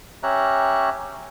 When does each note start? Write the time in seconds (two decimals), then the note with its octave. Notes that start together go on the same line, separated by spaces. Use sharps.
0.23 C#4 G4 C#5 E5 A#5 F#6